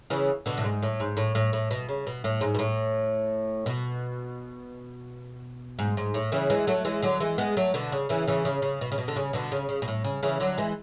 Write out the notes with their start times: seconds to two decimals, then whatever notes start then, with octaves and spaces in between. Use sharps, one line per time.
0.10 C#3 E3
0.46 B2 D3
0.58 A2
0.64 G#2
0.82 A2
1.00 G#2
1.17 A2
1.35 A2
1.53 A2
1.71 B2
1.89 C#3
2.07 B2
2.24 A2
2.41 G#2
2.54 B2
2.59 A2
3.66 B2
5.79 G#2
5.97 G#2
6.14 A2
6.32 C#3 E3
6.50 E3 G#3
6.67 F#3 A3
6.85 E3 G#3
7.02 D3 F#3
7.20 E3 G#3
7.38 G#3 B3
7.57 F#3 A3
7.74 B2 D3
7.92 C#3
8.09 C#3 E3
8.28 C#3 E3
8.45 C#3
8.62 C#3
8.81 B2
8.92 C#3
8.98 B2
9.08 D3
9.16 C#3
9.33 B2 D3
9.52 C#3
9.69 C#3
9.82 B2
9.88 A2
10.04 C#3
10.23 C#3 E3
10.40 D3 F#3
10.57 E3 G#3